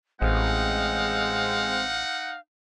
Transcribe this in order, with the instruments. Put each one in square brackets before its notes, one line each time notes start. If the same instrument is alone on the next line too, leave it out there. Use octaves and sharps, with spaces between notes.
[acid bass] A1 [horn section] G#3 C4 [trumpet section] D#4 F#5 [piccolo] F5